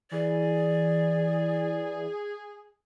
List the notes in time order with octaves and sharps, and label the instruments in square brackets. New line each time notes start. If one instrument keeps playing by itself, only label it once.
[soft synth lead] E3 [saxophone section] G#4 [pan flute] D5